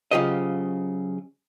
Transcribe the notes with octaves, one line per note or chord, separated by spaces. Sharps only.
C#3 F#3 F4 G4 C5 D#5